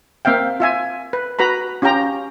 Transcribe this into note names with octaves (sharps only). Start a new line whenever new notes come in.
A#3 C4 E5 F5 G5
F4 E5 G#5
B4
F#4 B4 A#5 B5
C#4 F4 G4 G5 A#5